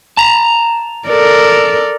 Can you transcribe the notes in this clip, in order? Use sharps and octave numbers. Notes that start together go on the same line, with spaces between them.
A5 A#5
A4 A#4 D5